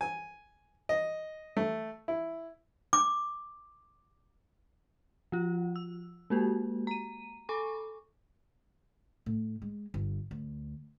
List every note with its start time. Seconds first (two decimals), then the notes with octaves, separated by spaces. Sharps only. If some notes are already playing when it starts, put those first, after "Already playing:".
0.01 G#5
0.89 D#5
1.57 A3
2.08 E4
2.93 D6
5.32 F3 F4
5.76 E6
6.30 G#3 A#3 F#4 G4
6.87 A#5 D#7
7.49 A4 G#5 B5 C#6 D6
9.26 A2
9.62 G#3
9.94 G1
10.31 D2